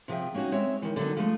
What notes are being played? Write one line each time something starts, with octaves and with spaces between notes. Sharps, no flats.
C3 F3 G#4 E5 G5
A#3 C#4 D#4 F#4
G#3 C4 C#5 E5
D#3 E3
D3 F#3 B3 D#4
F3 G#3 A3